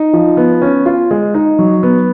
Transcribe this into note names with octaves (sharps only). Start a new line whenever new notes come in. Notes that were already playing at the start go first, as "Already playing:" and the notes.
Already playing: D#4
F3
B3
C#4
F4
G#3
D#4
F#3
B3